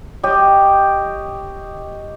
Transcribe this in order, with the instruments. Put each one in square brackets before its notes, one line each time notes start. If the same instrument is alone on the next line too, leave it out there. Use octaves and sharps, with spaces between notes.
[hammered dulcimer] G4 C#5 D#5